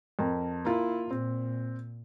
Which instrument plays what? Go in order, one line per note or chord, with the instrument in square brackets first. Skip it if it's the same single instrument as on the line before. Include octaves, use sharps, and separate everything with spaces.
[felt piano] F2 A#4
[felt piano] A#3 F4 [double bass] E4
[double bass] A#2 [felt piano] C4